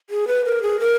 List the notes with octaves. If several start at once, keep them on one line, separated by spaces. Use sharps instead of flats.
G#4
B4
A#4
G#4
A#4